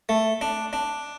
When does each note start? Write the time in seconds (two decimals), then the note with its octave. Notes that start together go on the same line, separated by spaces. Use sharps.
0.09 A3
0.41 D4
0.73 D4